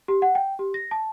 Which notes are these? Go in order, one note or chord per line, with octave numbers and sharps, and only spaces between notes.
G4
F#5
G5
G4
A#6
A5